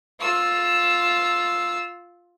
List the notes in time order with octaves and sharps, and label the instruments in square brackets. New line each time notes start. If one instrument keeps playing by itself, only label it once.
[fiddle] F4 E6